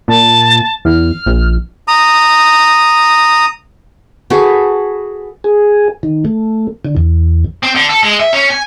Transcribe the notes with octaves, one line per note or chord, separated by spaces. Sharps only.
A#2 A5
E2 F6
A#1
A#5 D#6
F#4 G#4 A4 B4
G#4
D#3
A3
D3
E2
C4
D3
A4
G#3
E5
C#4
G#5